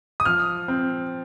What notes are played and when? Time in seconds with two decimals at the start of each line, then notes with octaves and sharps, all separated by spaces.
0.20 D#6
0.25 F3 F6
0.68 C4